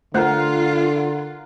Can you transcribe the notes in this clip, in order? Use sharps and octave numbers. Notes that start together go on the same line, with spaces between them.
D3 A3 F4 A#4 C5 F#5